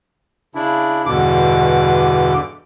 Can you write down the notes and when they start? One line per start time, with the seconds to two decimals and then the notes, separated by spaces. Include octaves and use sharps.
0.55 C#3 D4 E4
1.06 E2 G2 B2 D3 D6